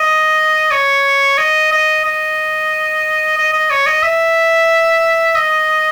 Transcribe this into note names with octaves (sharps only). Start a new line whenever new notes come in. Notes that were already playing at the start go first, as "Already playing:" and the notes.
Already playing: D#5
C#5
D#5
D#5
D#5
D#5
D#5
C#5
D#5
E5
D#5